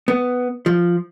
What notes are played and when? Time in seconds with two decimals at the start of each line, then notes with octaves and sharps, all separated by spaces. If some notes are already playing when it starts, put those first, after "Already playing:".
0.08 B3
0.66 F3